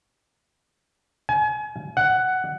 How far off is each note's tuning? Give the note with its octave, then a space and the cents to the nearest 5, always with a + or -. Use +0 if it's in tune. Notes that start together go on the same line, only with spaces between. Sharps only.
G#5 +35
F#5 +10